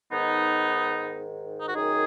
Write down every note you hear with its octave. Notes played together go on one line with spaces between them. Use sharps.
G#2 D#3 B3 D#4
D#4
F#4
F#2 D#3 D#4 G#4